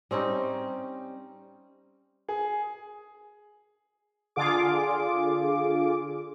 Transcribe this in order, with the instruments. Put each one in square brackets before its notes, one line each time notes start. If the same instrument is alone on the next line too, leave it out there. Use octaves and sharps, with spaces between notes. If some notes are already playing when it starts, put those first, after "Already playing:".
[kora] G3 C4 C#4 D#4
[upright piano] G#4
[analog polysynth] D3 F4 G#4 D6